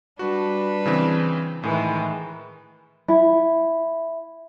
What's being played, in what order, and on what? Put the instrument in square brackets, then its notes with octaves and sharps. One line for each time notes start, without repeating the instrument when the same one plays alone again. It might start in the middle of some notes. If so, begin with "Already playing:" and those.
[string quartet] G3 D4 B4 [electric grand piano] F#4
[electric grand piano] C#3 E3 C4
[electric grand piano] A2 [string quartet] D#3 E3 G#3
[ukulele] E4